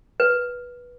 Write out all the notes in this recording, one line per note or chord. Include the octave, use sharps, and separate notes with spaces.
B4